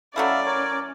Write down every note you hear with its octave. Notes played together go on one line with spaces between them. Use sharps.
F#3 A3 C#4 E4 D5 E5 F5
A#4 C#5 D6